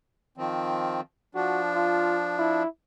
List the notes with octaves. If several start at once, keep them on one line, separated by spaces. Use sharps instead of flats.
D#3 F3 C4
F3 D4 F#4
F4
E4